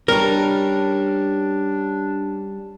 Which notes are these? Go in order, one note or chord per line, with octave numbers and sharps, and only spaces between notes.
G3 C#4 D4 A#4